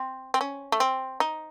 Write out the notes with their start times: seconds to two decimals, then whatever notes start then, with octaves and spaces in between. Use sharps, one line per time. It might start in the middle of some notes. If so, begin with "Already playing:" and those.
Already playing: C4
0.34 C4
0.41 C#4
0.72 A3
0.80 C4
1.20 D#4